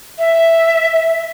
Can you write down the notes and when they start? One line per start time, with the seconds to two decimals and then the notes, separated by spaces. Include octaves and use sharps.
0.19 E5